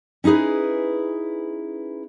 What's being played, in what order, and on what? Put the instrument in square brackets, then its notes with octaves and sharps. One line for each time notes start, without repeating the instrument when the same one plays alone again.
[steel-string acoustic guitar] C#4 D#4 E4 G#4 B4